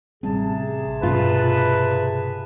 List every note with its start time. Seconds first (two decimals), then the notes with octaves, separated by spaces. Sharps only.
0.23 A1 C3 G3 C4 G#4 A5
1.03 G2 B2 B3 F4 B4